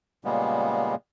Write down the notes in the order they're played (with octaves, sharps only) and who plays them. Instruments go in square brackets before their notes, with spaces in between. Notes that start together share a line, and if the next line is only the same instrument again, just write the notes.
[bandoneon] A#2 C#3 G3 G#3 A#3 B3